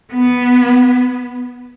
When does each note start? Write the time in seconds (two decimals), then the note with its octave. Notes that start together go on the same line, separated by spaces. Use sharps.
0.13 B3